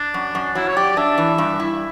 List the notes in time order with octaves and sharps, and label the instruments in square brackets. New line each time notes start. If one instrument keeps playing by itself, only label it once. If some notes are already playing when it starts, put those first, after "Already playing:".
Already playing: [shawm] D4
[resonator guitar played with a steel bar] F#2
F#2
[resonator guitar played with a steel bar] F#3 [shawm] E4
[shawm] C#5
[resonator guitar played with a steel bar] G4 [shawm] D5
[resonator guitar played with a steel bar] D4 [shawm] E5
[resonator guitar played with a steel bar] E3
G2
E4